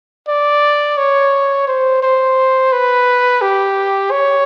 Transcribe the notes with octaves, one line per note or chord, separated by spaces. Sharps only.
D5
C#5
C5
C5
B4
G4
C#5